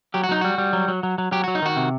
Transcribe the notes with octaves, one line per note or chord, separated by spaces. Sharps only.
F#3 G4
F#4
F#3 D#4
G3 F#4
G3
F#3
F#3
F#3
F#3
F#3 G4
F#3 F#4
D#4
D#3 F#4
C3